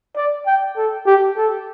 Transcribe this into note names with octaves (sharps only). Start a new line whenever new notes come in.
D5
G5
A4
G4
A4